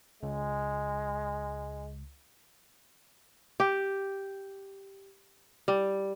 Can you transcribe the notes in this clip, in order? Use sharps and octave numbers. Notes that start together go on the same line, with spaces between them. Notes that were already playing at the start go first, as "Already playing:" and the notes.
C#2 G#3
G4
G3